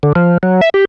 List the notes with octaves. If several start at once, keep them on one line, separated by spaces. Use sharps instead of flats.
D3
F3
F#3
E5
G4